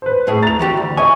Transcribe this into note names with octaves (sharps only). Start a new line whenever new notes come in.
B4 C5
A2 A3 G#4
A#5 A6 F7
E3 F#4 G4
D2
D#5 E5 G#5 C#6